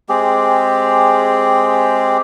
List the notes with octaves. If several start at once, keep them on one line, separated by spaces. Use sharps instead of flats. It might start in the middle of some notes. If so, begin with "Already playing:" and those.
G#3 C4 G4 G#4